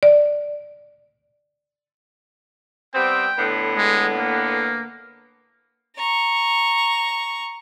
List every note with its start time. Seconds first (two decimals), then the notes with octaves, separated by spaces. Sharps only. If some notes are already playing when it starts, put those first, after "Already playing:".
0.03 D5
2.95 G3 B3 C4 G5
3.38 A2 D3 B3
3.77 G#3
4.17 A#3
5.96 A#5 C#6